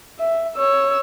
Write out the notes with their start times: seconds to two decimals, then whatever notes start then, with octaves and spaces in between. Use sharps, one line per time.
0.19 E5
0.56 C#5 E6